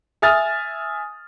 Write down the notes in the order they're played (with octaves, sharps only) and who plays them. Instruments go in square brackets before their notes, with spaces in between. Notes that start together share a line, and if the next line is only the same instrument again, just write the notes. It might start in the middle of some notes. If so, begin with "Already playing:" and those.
[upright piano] E5 G#5 D#6 F6 A6